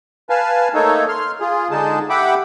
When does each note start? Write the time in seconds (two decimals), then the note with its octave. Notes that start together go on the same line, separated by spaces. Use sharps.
0.30 B4 F5 G#5 A5
0.74 A3 A#3 D#4 A4 C#5
1.09 C6 F6
1.40 F4 G#4
1.71 D3 G#3 D#4 G#4 A5
2.10 G4 E5 F#5 G5 B5 D6